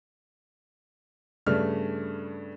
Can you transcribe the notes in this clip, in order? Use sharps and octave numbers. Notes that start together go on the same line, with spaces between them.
G2 C#3 A3 D4 F6